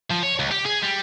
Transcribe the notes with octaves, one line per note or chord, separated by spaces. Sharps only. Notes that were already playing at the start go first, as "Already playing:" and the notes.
F3
C#5
C#2
G4
G#4
G3